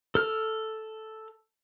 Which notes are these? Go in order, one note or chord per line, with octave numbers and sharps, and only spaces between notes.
A4 F6